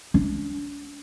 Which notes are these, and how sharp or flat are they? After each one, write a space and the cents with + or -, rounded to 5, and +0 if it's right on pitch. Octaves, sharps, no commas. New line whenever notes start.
D4 -40